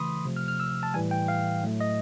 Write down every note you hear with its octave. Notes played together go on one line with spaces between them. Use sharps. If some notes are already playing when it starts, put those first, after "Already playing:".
Already playing: C#3 E3 A3 B5 C6 D#6
C3 F3 A3
F6
F6
E6
A5
A2 E3 G3 G#5
G5
F5
A2 F#3 A3
D#5